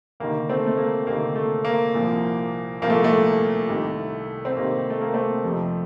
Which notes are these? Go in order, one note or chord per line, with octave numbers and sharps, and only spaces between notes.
D2 C3 D#3 A#3
A3 C4
A3
A#3
D2 C3 D#3 A#3
A3
A#3
C2 A#2 F3
C2 A#2 F3 A#3
A3
A3
C2 C3 D#3
C4
C2 C3 D#3 A#3
A3
A#3
A3 C4
F2 C3 F3